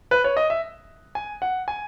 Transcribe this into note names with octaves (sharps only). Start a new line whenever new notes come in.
B4
C#5
D#5
E5
G#5
F#5
G#5